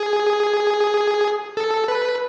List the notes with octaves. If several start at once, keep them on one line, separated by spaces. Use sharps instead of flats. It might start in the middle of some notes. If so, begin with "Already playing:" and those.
Already playing: G#4
A4
B4